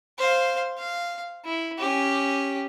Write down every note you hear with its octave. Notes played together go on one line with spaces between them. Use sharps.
C5 F5
F5
E4
C#4 G4